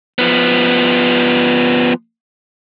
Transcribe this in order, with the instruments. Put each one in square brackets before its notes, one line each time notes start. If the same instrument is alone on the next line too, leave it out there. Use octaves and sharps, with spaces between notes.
[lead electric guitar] F3 B3